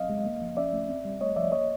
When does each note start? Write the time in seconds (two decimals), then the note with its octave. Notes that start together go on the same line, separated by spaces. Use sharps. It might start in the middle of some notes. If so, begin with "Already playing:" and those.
Already playing: F#3 C4 D#5 F5
0.10 G#3
0.25 A#3
0.42 F3
0.57 C#4 D5 E5
0.73 A3
0.89 C4
1.05 G3
1.21 A3 C#5 D#5
1.36 F3 D5 E5
1.52 A#3 C#5 D#5